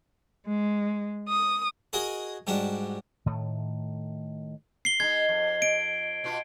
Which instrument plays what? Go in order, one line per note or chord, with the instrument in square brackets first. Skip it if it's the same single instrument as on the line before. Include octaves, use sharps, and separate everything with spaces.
[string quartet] G#3
D#6
[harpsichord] F#4 G#4 A#4 D#5 G#5
G#2 G3 D4 F#4
[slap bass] A2 D#3 A3
[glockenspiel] C7 G7
[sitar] G#3 D#4 [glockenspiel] G#6
[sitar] F2
[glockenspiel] D7
[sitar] B2 B3 F4